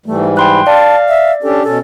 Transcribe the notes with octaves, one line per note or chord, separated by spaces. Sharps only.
G#2 E3 G3 A3
G5 B5 C6 F#6
D5 F5 A5
E5
C#4 D4 G4 A4
B2 C#4 A4